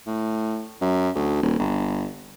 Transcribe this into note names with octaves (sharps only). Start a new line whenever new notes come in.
A2
F#2
D2
D#1
G1